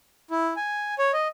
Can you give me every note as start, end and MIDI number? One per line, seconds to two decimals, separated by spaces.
0.31 0.54 64
0.56 0.94 80
0.98 1.11 73
1.13 1.28 75